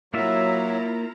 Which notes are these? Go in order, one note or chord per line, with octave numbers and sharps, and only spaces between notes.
F#3 A#3 E4 F4 E5 A#5